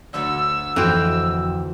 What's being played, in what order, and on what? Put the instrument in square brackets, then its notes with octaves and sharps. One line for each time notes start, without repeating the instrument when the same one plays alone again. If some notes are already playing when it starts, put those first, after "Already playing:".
[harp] D2 D3 [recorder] E6
[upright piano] F2 [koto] E3 C4 [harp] F#4